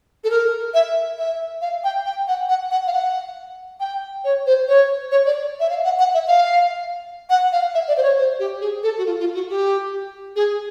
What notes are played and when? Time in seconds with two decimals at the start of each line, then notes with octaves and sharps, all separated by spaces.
0.24 A4
0.30 A#4
0.74 E5
1.18 E5
1.62 F5
1.84 G5
2.06 G5
2.28 F#5
2.49 F#5
2.71 F#5
2.87 F5
2.93 F#5
3.80 G5
4.24 C#5
4.46 C5
4.68 C#5
5.11 C#5
5.26 D5
5.60 E5
5.70 F5
5.84 F#5
5.99 F#5
6.14 E5
6.28 F5
7.30 F#5
7.52 F5
7.75 E5
7.88 D5
7.97 C5
8.03 C#5
8.18 C5
8.39 G4
8.61 G#4
8.83 A4
8.98 F#4
9.06 F4
9.20 F4
9.35 F#4
9.50 G4
10.36 G#4